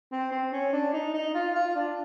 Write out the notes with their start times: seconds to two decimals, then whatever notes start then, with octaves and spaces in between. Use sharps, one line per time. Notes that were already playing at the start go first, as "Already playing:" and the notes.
0.12 C4
0.32 C4
0.53 C#4
0.73 D4
0.93 D#4
1.14 D#4
1.34 F4
1.55 F4
1.75 D4